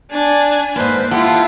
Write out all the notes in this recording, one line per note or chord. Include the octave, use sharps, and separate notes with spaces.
D4 G#5
G#2 A#3 B4 C5
E4 F4 G4 A4 F#5